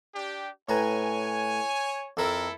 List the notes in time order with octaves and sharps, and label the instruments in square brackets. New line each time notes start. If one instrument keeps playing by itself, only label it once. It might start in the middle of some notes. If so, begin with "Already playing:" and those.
[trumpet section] D4 G4
[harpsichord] A2 B4 A#5 [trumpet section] C#5 G#5
[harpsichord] F2 A#4 [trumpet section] E4 A4